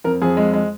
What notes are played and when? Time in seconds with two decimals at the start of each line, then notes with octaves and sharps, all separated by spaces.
0.04 F2 A#4
0.22 F2 G#4
0.37 G#3
0.53 G#3